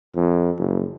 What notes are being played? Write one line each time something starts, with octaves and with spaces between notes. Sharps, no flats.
F2
F#1